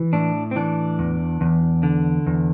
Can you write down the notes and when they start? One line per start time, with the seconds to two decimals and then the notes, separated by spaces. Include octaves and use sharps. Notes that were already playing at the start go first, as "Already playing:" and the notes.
Already playing: E3
0.13 A2 D4
0.51 C4
0.56 E3 D4
0.99 E2
1.41 E2
1.83 D3
2.27 E2